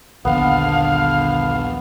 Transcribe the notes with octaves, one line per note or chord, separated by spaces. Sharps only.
A#1 D#2 D3 B3 D4 F5